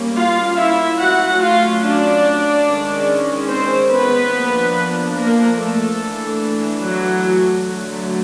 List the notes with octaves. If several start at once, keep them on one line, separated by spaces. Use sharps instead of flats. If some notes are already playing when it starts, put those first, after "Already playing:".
Already playing: G3 A#3 C#4
F4 F5
E4 E5
F#3 A3 C#4 F#4 F#5
F4 F5
D4 D5
D#3 G#3 C#4
C4 C5
B3 B4
F3 A#3 D4
A#3 A#4
A3 A4
E3 A3 D4
F#3 F#4
D3 F#3 A3